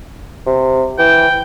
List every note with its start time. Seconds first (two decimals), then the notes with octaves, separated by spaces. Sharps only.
0.47 C3
0.99 E3 G5